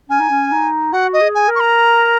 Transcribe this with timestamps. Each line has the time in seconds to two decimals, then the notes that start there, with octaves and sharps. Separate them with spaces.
0.09 C#4 G#5
0.20 D#4
0.30 C#4
0.52 D#4
0.93 F#4 F#5
1.13 D#5
1.21 G#4
1.35 G#5
1.48 A#4
1.55 C#6
1.60 A#5